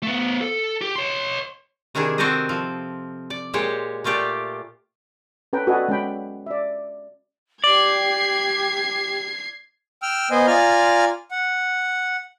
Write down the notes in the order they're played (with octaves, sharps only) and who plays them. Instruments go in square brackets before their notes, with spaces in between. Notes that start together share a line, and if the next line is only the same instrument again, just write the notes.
[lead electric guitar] A3 B3
A4
G4
C#5 C6
[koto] C3 D#3 D4 E4 G#4
C4 F#4 A4 A#4 C5 D#5
F3
D5
A#2 G#3 G4 C5 C#5
A#2 A3 F4 G4 D5
[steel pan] C#4 A4 B4 G5 A#5
F#4 A4 B4 D5 D#5 G#5
G#3 C#4 G5 B5
D5 E5
[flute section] G4 [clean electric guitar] D5 [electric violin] G#6 C7
[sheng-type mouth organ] G5 E6 F6
B3 C5 D#5 G#5
F4 D5 G#5 A#5 F6
F#5